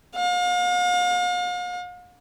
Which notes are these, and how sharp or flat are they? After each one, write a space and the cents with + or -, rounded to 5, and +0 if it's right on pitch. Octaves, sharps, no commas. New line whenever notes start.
F5 +40